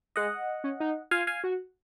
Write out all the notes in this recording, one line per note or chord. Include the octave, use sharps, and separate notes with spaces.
G#3 D#5 F#5
C#4
D#4
F4 F5 G#5
F5 G#5
F#4